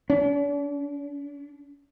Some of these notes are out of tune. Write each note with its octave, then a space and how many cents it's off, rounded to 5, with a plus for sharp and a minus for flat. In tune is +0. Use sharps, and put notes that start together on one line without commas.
D4 -45